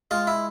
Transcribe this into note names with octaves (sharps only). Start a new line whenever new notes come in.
G#3 F4
E4